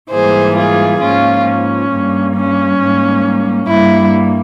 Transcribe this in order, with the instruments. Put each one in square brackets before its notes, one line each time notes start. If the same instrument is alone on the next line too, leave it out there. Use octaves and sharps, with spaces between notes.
[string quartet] G#2 E3 G3 A#3 G#4 C5
F4 G#4
G#2 F3 A#3 C#4 F4
C#4
G2 G3 A#3
C#4
G#2 G3 A#3
G2 G3 A#3 E4